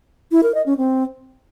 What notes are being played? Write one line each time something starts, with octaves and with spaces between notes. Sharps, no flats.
E4
A#4
D#5
C#4
C4